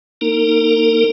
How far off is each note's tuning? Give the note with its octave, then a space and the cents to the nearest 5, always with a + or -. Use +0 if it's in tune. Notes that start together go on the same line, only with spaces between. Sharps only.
A#3 +0 D#4 +0 A#4 -40